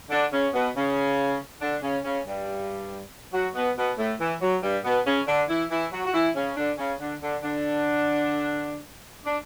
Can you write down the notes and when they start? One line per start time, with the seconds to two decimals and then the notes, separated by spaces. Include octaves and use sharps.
0.10 D3 D4
0.32 C#3 C#4
0.53 B2 B3
0.76 C#3 C#4
1.61 D3 D4
1.82 C#3 C#4
2.04 C#3 C#4
2.26 G2 G3
3.33 F#3 F#4
3.55 B2 B3
3.77 B2 B3
3.98 A2 A3
4.20 E3
4.41 F#3
4.63 G2 G3
4.84 B2 B3
5.06 C#3 C#4
5.27 D3 D4
5.49 E3 E4
5.70 E3 E4
5.92 F#3 F#4
6.06 F#4
6.13 E3 E4
6.35 C#3 C#4
6.56 D3 D4
6.78 C#3 C#4
6.99 D3 D4
7.21 D3 D4
7.43 D3 D4
9.25 D4